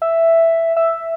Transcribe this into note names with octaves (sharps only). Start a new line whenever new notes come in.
E5
E5